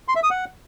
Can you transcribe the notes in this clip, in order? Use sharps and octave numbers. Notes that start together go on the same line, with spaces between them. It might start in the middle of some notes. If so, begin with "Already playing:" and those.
C6
E5
D#6
F#5